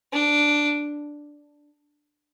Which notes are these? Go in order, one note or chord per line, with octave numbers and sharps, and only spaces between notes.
D4